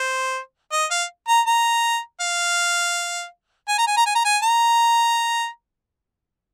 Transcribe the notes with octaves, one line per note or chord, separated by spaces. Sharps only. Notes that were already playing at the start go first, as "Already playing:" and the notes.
Already playing: C5
D#5
F5
A#5
A#5
F5
G#5
A#5
G#5
A#5
G#5
A#5
G#5
A#5